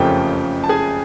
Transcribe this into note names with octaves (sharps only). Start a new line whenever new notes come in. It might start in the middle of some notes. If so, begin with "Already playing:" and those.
Already playing: F#1 F2 C#3 F3 A3 G4 G5
A5
G#4 G#5